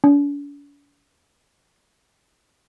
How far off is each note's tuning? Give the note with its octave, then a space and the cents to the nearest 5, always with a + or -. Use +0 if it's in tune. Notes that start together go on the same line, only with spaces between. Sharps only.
D4 -45